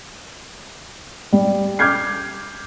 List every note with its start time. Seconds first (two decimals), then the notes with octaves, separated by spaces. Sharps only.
1.32 G3
1.79 D6 F6 G6 G#6 C7